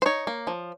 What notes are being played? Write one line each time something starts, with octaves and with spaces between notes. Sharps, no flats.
C5
D#4 C#5
A#3
F3